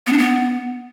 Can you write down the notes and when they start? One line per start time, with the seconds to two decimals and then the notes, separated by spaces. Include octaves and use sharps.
0.07 B3
0.12 D4
0.18 B3